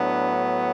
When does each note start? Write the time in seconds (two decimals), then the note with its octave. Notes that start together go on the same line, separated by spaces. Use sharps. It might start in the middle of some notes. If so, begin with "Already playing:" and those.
Already playing: A2 F#3 B3 D4